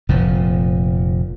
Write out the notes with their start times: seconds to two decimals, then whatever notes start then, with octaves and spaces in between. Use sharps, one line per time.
0.09 F1 A#2 F3